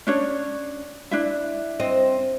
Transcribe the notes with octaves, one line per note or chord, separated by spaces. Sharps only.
C#4 D4 C#5
D4 E4 E5
C4 D#5